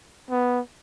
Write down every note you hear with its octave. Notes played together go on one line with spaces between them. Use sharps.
B3